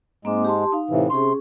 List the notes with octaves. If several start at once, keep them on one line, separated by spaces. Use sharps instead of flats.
G#2 G#3 A#3 C4 D6
G4 A5 C6
D#4 F5
A2 C3 E3
C3 C#4 G#4 C6